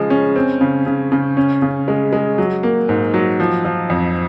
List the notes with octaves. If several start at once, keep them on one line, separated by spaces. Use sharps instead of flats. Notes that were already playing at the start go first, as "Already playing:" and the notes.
Already playing: C#3 F3 G#3
C#4
C4
C#3
C#3
C#3
C#4
C#3
G#3
G#3
F#3
A#3
G#2
F#3
F3
F3
F2